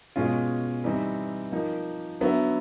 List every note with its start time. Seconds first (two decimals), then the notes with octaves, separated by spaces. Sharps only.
0.16 B2 G#3 C#4 F4
0.84 E3 G3 C4 D#4
1.52 F3 A#3 D#4
2.21 D3 F#3 B3 E4